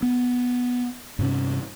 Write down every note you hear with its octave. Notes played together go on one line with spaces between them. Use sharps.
B3
G2 C3 C#4